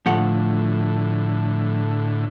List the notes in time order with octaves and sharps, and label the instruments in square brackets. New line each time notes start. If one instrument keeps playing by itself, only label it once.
[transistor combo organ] A2 D3 [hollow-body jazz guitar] F3 A3 F#5